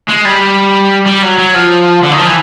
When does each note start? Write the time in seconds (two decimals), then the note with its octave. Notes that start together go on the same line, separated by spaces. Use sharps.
0.08 G#3
0.25 G3
1.06 G3
1.22 F#3
1.39 F#3
1.55 F3
2.03 D3
2.11 D#3
2.19 F3
2.27 E3